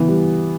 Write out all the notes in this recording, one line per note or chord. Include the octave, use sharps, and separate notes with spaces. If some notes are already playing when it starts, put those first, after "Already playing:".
Already playing: E3 B3
G3